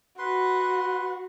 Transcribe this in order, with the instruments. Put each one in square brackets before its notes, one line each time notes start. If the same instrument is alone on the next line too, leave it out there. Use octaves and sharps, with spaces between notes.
[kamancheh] F#4 [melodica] B4 C6